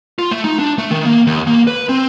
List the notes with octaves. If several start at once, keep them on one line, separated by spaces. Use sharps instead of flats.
F4
A3
D#4
D4
A3
D#3
A#3
D#2
A#3
B4
C4